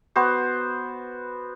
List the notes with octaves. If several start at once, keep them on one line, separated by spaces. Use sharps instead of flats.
B3 F#4 C5